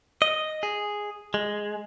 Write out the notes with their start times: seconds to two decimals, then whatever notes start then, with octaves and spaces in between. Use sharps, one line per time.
0.22 D#5
0.63 G#4
1.34 G#3